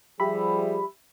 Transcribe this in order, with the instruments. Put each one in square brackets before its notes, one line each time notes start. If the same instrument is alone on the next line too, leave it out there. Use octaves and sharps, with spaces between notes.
[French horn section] F3 G3 G#4 [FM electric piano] G4 E5 B5